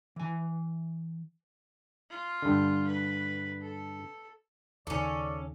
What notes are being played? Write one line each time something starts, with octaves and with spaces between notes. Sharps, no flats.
E3 G#5
F4
G2 D3
B4
A4
D#2 C#3 C#4 A4 D5